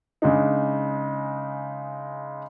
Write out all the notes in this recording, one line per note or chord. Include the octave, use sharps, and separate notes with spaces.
C#3 G#3 D4 D#4